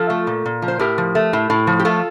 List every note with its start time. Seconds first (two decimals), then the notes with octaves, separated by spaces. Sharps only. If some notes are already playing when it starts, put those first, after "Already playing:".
Already playing: F3 F4 A4
0.10 A3
0.27 A#2
0.46 A#2
0.62 F3
0.68 C5
0.79 A2 G4 A#4
0.98 F3
1.15 A3
1.33 A2
1.50 A2
1.67 F3
1.79 G4
1.85 A3 F4 A4